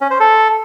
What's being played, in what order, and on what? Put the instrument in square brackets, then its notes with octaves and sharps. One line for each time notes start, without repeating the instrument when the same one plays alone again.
[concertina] C#4
C5
A4